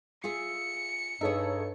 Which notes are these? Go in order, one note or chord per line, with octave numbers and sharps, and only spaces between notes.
F4 G#4 E5 C#7
G2 D#4 G#4 A4 C#5 E5